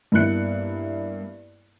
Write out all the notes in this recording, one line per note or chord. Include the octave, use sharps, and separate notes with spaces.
G2 A#3 B3 E4 F#6 C#7